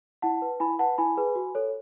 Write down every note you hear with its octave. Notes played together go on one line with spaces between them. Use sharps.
E4 F#5 A5
B4
E4 G#5 B5
B4 F#5 A5
E4 G#5 B5
G#4 B4
F#4
A4 C#5